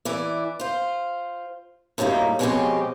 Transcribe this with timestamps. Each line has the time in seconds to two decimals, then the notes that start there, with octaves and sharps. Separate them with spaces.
0.05 E3 E4 D5
0.60 F4 C5
1.98 F#2 A2 G3 A#3 D#4
2.39 B2 F3 G#3 C4 C#4 G4